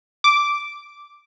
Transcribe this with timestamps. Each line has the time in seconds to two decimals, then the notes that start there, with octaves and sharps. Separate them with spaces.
0.24 D6